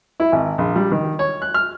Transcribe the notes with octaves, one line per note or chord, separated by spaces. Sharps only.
E4
G#1
A#1
G3
D#3
C#5
F#6
F6